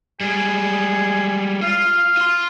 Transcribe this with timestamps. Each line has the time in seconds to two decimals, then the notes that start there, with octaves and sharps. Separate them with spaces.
0.21 G3 G#3 G#4
1.62 F4 F5
2.17 F4 C6